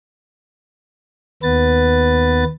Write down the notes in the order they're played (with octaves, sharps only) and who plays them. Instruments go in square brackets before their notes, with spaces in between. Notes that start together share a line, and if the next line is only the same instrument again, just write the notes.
[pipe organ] D#2 B3 B4 A6